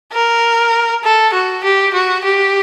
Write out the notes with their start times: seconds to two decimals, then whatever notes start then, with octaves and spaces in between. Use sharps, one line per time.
0.12 A#4
1.03 A4
1.34 F#4
1.64 G4
1.94 F#4
2.24 G4